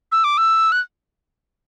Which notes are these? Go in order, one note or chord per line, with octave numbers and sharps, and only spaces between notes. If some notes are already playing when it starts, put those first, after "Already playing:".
E6
D6
E6
F#6